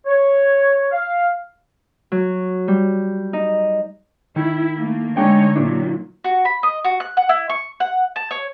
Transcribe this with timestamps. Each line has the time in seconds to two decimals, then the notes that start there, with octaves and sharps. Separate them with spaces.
0.07 C#5
0.92 F5
2.12 F#3
2.68 G3
3.33 D#4
4.36 D#3 E4
4.78 A3 A#3
5.17 D3 G#3 D4 D#4 C#5 G5
5.56 A#2 D#3 F#3 D4 E4
6.24 F#4
6.45 B5
6.63 D#5
6.85 F#4
7.00 F#6
7.17 F#5
7.29 E4
7.50 C#6
7.80 F#5
8.16 A5
8.31 C#5